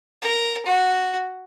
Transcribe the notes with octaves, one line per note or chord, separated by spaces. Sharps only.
A#4
F#4